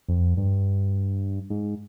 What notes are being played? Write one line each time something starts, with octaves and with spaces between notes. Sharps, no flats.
F2
G2
G#2